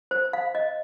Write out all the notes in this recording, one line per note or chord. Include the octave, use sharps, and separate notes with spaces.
C5
F5
D#5